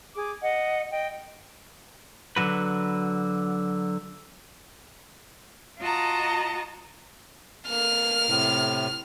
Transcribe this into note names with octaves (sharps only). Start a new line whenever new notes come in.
G#4 D6
D#5 F#5
D#5 G5
D3 F#3 F#4 B4
F4 F#4 D#5 A5 A#5
A#3 F6
A2 C3